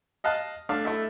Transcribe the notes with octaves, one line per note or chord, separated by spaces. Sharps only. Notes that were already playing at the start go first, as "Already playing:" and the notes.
D#5 F5 A5 F#6
A3 D4 D5 F5
A3 E4 E5